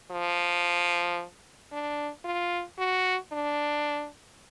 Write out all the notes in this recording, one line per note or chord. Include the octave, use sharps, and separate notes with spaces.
F3
D4
F4
F#4
D4